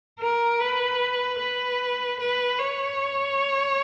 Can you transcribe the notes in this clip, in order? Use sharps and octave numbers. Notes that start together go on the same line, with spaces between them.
A#4
B4
B4
B4
C#5